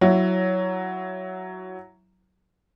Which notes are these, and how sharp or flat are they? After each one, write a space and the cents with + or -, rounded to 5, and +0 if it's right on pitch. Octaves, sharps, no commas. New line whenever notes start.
F#3 +5 E4 +10